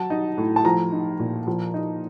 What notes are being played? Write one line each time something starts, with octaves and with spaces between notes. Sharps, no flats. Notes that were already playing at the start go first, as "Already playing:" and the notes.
Already playing: F#3 A5
D#4
A2
A5
F3 A#5
D#4
A#2
F3
D#4